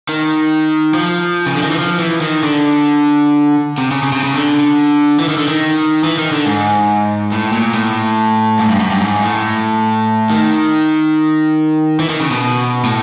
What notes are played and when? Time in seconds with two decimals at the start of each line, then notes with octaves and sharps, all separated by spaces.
0.09 D#3
0.94 F3
1.46 C#3
1.54 D3
1.63 D#3
1.71 E3
1.78 F3
2.00 E3
2.21 D#3
2.43 D3
3.78 C3
3.91 C#3
4.03 C#3
4.12 C3
4.24 C#3
4.34 D3
5.19 E3
5.29 D#3
5.37 D3
5.48 D#3
6.04 E3
6.18 D#3
6.32 D3
6.46 G#2
7.32 A2
7.53 A#2
7.74 A2
8.59 G#2
8.69 G2
8.80 F#2
8.91 G2
9.01 G#2
9.23 A2
10.30 D#3
12.00 E3
12.10 D#3
12.20 C#3
12.31 B2
12.84 A2